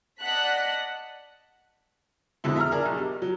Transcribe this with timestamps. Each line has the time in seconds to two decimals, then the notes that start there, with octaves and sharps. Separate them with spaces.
0.20 D5 D#5 F#5 A5 F#6 B6
2.44 F2 B2 D3 G#3 E4
2.56 E5 A#5 F6
2.71 D4 G#4 A#4
2.86 B1
2.97 G3
3.22 F#3